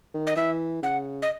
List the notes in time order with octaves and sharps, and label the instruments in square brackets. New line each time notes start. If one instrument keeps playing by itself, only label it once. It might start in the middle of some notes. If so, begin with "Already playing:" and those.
[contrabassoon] D#3
[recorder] D#5
[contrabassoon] E3 [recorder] E5
[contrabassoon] C#3 [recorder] F#5
[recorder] D#5